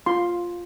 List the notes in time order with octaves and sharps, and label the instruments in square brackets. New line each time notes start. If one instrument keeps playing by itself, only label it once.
[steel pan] F4 C6